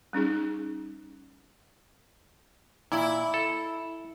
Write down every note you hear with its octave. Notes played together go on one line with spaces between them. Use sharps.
G3 C#4 D#4 G#4
A#2 E4
A4